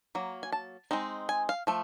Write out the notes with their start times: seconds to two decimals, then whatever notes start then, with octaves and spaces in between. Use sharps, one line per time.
0.15 F#3 A#3
0.43 G#5
0.52 A5
0.91 G#3 C4 D#4
1.29 G#5
1.49 F5
1.67 F3 A3